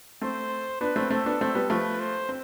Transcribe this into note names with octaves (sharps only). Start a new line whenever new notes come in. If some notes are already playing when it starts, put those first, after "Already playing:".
A3 C4 C5
B3 D4 B4
A3 C4
A3 C4 A4
B3 D4
A3 C4
G3 B3
F3 A3 B4
C5
C4